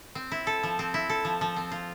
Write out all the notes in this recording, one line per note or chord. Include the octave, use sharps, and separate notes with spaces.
C4
E4
A4
F3
C4
E4
A4
F3
F3
C4
F4